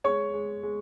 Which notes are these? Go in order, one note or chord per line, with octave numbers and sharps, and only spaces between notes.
G#3 C#5 C#6
G#3
G#3